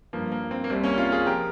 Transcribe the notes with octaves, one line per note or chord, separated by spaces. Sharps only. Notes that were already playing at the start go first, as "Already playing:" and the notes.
G2 F3 A#3
A#3
C4
A#3
C2 C3 G3 C4
A#3 C#4
C#4 F4
F4 G#4
F3 G4 A#4